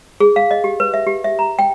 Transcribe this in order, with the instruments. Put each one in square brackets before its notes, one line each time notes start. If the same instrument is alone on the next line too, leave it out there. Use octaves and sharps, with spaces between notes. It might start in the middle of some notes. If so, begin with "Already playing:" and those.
[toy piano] G#4
F5
D#5
G4
B4
E5
G4
E5
A#5
G5